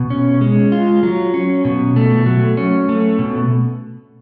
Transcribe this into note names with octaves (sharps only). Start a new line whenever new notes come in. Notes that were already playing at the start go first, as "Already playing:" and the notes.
Already playing: B2
C#4
G#3
F4
F#3
C#4
B2
A3
F#3
C#4
A3
B2